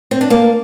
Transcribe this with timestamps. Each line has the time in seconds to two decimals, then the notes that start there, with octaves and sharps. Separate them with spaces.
0.11 C4
0.21 D4
0.30 A#3